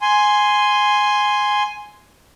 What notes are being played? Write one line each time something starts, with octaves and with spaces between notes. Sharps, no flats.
G#5 C6